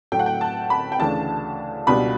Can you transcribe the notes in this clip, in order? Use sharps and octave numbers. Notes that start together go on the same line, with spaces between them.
A2 F#3 A3 G5
F#5
G5
A5
B5
G5
D2 C#3 E3 A3 D4 A5
C#2 B2 G3 D4 B5